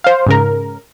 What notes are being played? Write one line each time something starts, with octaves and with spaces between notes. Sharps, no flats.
C5 F5
G#2 C#3 A#4